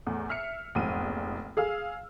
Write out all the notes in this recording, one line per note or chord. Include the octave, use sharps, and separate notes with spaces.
E2 A2
E5 F6 C7 C#7
F1 A#1 E2 G#2 D#7
G#4 F5 E6 F6